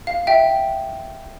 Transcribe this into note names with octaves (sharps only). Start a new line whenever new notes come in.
F5
E5 G5